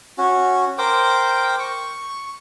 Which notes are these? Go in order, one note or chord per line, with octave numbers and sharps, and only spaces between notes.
C#4 F#4
A#4 C5 G5 D6
C#6